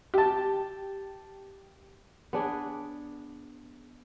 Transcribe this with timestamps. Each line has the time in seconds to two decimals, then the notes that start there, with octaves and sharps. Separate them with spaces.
0.14 G4 A5
2.33 B3 D4 G#4